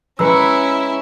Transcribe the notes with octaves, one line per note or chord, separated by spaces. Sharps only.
G#3 C#4 E4 B4 A#5 B5 E6 C#7